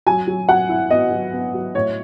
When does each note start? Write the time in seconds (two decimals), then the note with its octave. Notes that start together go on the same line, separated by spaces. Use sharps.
0.07 F#3 G#5
0.27 F#3
0.49 F#3 F#5
0.69 E4
0.90 B3 D#5
1.11 F#3
1.33 B3
1.54 F#3
1.74 A2 C#5